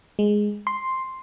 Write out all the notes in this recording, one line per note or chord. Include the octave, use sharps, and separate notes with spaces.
G#3
C6